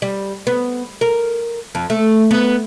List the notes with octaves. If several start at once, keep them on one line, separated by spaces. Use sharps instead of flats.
G3
B3
A#4
F2
A3
B3